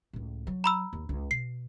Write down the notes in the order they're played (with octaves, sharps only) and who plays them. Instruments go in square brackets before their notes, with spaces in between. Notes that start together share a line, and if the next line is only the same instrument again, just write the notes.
[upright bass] C#2 A2
F#3
[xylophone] A#5 B5 E6
[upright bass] D#2
C#2
[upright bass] B2 [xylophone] C7